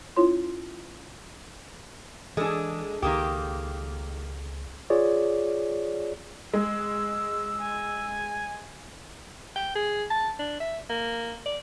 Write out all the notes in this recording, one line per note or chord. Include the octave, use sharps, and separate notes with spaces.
C#4 E4 F4 C#5 C6
E3 G#3 D4 G#4 A4
C#2 D#3 A#3 G4 D#6
F4 G#4 C#5 D5
G#3 E6
G#5
G5
G#4
A5
D4
E5
A#3
D5